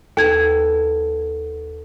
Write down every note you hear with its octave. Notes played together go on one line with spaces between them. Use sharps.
D#2 B3 A4 G#6